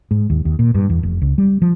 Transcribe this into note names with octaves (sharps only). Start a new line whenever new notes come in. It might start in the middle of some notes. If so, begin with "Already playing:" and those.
G#2
D#2
D#2
A#2
G2
E2
F1
C#2
G3
F3